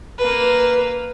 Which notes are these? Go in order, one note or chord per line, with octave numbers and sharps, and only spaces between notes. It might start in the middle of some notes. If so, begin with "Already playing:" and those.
A#3 B4